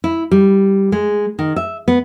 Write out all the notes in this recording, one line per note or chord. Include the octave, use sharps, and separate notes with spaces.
E4
G3
G#3
D#3
E5
B3